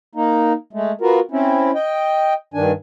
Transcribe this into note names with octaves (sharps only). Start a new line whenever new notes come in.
A#3 D#4
G#3 A3
B3 F4 F#4 A#4
C4 C#4 E4
D#5 G5
G2 D#3 D4 G#5